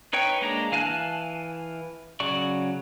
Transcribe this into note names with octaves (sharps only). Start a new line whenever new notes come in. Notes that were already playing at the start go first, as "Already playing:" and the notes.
D#4 B4 C#5 G5
G#3 A#3 D4 A#5
E3 F5 G#5 A5 F#6
C#3 F#3 D5 C#6